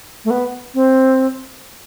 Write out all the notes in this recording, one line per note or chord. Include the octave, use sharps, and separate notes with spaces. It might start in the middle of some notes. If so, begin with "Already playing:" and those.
A3
B3
C4